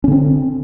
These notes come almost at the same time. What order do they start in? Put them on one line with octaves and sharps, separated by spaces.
C#4 D3 C4